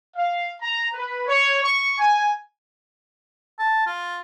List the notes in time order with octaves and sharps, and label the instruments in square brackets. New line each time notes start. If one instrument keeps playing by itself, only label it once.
[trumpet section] F5
A#5
B4
C#5
C#6
G#5
[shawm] A5
F4